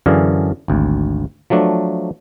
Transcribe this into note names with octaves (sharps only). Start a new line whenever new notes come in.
F#2 D3 E3 D4 G#4 F5
G#1 D2
F3 F#3 A3 D4